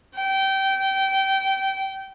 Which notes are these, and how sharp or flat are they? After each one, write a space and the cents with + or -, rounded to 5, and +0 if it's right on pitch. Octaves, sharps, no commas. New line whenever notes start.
G5 -20